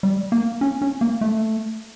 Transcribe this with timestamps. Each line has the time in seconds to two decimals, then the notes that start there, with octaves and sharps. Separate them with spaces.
0.03 G3
0.32 A#3
0.61 C#4
0.82 C#4
1.01 A#3
1.21 A3